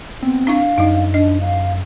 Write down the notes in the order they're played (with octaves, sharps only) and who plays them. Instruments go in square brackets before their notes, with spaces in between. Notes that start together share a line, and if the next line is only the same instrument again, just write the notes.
[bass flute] B3 [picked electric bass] C4
[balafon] D4 E4 C#6 [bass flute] F5
[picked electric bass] F#2 [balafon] G3 D#4
[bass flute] D4 [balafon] D#5
[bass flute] F5